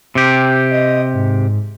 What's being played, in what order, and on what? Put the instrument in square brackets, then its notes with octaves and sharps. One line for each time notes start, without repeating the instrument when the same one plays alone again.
[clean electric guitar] C3 G4
[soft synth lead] D#5
G#2